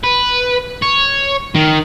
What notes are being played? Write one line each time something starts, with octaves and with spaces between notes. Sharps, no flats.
B4
C#5
D#3